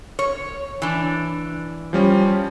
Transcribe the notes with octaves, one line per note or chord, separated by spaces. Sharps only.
C#5
E3 D4
F3 G3 C#4